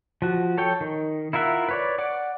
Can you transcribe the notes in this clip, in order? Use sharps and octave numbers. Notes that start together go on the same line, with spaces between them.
F3 F#4
A4 C#5 G5
D#3
E4 F4 A#4 E5 F#5
B4 C#5 D5
D5 F#5 D6